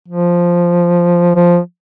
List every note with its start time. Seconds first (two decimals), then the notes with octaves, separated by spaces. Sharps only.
0.08 F3
1.36 F3